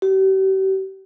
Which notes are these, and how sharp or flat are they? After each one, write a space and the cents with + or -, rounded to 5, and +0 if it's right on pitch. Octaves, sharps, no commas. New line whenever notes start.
G4 -40